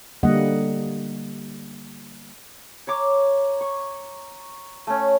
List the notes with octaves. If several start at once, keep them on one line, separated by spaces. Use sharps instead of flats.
D3 G3 A#3 D#5 F#5
C#5 A#5 D6
C#6
A3 C#4